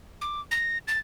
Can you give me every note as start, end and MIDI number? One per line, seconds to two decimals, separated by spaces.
0.21 0.41 86
0.51 0.78 94
0.88 0.98 93